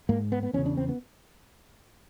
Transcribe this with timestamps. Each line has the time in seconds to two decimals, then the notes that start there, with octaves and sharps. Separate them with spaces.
0.09 G#2 A#3
0.32 B3
0.43 B3
0.53 E2 C#4
0.58 C#3
0.66 D4
0.77 C4
0.89 B3